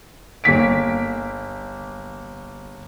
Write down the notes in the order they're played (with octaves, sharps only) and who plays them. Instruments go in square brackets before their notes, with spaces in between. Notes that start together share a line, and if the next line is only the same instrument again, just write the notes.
[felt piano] G1 A#3 B6 D7